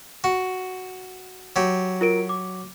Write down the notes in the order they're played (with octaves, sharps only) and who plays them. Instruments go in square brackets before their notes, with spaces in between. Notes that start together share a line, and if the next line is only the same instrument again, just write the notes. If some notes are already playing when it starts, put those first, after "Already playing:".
[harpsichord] F#4
F#3 G4
[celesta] F4 A#4 D7
D6